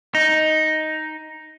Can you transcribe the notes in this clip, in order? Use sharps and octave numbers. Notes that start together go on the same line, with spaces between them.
D#4